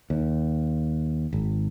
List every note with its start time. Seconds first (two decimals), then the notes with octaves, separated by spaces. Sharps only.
0.10 D#2
1.33 G#1